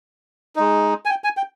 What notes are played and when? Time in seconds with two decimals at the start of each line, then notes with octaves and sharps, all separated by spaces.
0.56 G#3 D#4
1.05 G#5
1.10 G5
1.24 G#5
1.37 G5